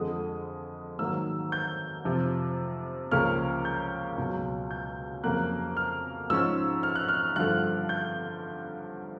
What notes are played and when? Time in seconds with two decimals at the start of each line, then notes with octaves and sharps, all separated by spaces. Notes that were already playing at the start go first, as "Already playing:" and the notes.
Already playing: F2 D3 F3 G#3 D#6
0.99 G#2 D#3 F#3 A#3 E6
1.52 G6
2.05 F2 C3 F3
3.11 C#2 C#3 F3 A#3 C#4 F6
3.65 G6
4.18 C#2 B2 F#3
4.71 G6
5.24 F2 C#3 F#3 A#3 F#6
5.77 F6
6.30 G#2 F3 G#3 C#4 E6
6.83 F6
6.95 F#6
7.09 F6
7.36 G2 D3 F3 A3 F#6
7.89 G6